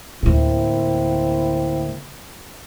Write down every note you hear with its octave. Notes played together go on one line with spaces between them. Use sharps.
D2 A2 A#3 C4 E4